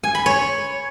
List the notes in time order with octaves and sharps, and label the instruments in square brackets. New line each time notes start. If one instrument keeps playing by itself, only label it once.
[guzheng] G#5
B5
C#5